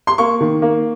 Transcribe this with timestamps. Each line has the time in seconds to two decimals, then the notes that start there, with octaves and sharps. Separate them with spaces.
0.07 C6
0.18 A#3 C#6
0.40 D#3
0.62 A#3